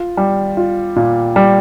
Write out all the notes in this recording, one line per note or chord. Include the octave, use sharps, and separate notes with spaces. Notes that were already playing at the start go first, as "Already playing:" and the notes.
Already playing: F4
G3
F4
A#2
G3